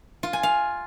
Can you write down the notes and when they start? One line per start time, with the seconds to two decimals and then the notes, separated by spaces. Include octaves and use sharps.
0.23 F4
0.33 G#5
0.43 F5